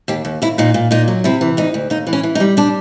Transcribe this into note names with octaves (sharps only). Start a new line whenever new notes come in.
D#2 G4
D#2
D#2 E4
A#2 D#4
A#2
A#2 D#4
F#3
C3 E4
E3
D2 D#4
D2
D#2 D#4
E3
C#4
E3
D#4
G3
G3 D4